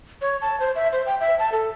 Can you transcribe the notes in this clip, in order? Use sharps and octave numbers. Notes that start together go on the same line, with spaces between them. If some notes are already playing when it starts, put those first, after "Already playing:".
C#5
A5
C5
E5
C5
G5
E5
A5
A4